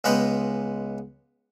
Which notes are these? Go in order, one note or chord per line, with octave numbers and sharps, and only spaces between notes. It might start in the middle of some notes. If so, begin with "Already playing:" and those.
C#2 G#3 B3 B4 D#5 G5